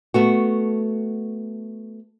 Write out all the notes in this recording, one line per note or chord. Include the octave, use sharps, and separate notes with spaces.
A3 B3 F#4